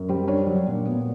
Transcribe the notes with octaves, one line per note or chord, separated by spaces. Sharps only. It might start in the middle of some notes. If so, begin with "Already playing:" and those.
Already playing: F#2
G3 C5
D4 C#5
F#3
A#2
B3